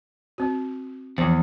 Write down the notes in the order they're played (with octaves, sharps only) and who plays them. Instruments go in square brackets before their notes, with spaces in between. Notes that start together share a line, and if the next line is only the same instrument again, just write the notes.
[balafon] C4 F#4
[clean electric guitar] E2 [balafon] F3 C5